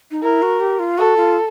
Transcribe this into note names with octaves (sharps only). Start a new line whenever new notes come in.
D#4
E4 A#4
F#4
G4
F4
F#4 A4
F4